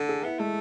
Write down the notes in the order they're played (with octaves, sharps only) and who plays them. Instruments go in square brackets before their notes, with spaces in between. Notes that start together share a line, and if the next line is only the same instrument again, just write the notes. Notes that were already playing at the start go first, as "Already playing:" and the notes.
Already playing: [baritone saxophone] D3 [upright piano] A4
[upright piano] G#4
[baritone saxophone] B3 [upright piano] E4
[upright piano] G#3 [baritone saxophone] A3